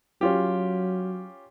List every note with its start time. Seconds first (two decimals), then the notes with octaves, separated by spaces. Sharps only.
0.21 F#3 C#4 F4 G4